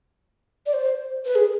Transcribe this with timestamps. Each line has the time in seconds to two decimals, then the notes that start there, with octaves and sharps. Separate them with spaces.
0.66 D5
0.73 C5
1.25 B4
1.35 G#4